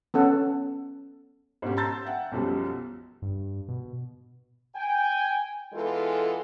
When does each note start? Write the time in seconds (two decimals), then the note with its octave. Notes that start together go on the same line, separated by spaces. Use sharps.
0.14 B3 C#4 A4 F#5
1.62 G#2 B2 C#4 G4
1.77 A5 A#5 C6 E6 G6 A6
2.05 E5 F#5 G5
2.32 B1 F#2 B2 F3 G3
3.22 G2
3.68 B2
4.76 G5 G#5
5.74 E3 G#3 B3 E4 F4 A4